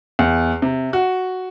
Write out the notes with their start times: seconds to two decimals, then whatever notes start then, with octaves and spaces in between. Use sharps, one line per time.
0.19 E2
0.62 C3
0.93 F#4